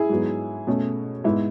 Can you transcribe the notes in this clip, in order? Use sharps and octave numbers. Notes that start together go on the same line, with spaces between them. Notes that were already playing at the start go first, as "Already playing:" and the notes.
Already playing: E4 G#4
G#2 F#3 B3
B2 A3 C#4
G#2 G#3 B3 E4